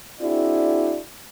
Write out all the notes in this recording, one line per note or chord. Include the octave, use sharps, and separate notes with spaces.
C4 D4 E4 F#4 G#4 D5